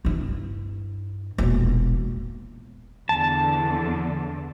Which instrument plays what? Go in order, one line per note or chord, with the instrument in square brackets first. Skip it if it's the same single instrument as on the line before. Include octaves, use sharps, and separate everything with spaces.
[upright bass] G2 E4
E1 A#1
[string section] E2 D3 [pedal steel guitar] A5